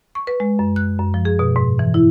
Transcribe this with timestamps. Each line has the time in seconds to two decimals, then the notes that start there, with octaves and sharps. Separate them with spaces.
0.15 C#6
0.27 B4
0.40 G#3
0.59 F#2
0.76 F#6
0.99 F#2
1.14 F3
1.25 G#4
1.39 B2
1.56 G#2
1.79 E3
1.94 E4